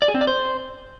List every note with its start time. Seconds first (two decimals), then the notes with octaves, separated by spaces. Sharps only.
0.02 D5
0.08 G#4
0.15 C4
0.21 D5
0.27 C5